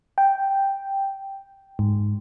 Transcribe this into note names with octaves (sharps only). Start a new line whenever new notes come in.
G5
G#2